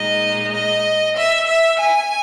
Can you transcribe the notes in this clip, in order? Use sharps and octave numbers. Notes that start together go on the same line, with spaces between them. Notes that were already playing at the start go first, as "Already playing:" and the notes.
Already playing: A#2 G#3 D#4 D#5
D#5
E5
E5
G#5